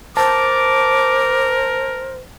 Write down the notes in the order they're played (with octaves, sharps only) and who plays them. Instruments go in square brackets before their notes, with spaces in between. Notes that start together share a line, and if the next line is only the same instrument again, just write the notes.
[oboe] A#4 [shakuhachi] C5 [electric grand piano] A5 [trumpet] D6